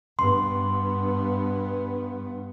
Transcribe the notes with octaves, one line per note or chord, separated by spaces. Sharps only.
G2 B3 C6